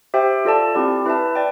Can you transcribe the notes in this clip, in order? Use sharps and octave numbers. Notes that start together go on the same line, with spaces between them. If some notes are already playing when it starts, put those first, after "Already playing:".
G4 C5 E5 G5
F4 A4 D5 A5
C4 E4 G4 D5
E4 B4 E5 A5
D5 G5